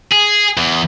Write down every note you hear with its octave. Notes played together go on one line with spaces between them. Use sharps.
G#4
E2